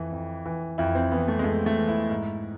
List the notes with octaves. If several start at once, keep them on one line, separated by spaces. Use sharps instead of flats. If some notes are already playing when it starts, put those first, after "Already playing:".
Already playing: F2 E3
F2
E3
F2 E4
C4
E3 B3
A3
G#3
F2 A3
A3
E3
E4
G#2